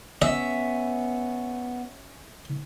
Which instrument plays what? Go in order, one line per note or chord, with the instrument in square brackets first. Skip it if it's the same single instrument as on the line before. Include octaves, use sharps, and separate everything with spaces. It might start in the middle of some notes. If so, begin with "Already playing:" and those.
[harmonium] B3 [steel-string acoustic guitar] C#4 [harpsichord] D#5 [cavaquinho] E5